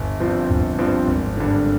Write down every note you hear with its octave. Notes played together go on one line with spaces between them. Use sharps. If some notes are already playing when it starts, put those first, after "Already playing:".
Already playing: G1
G2 F3 C4
G1
G2 F3 C4
G#1
G2 D3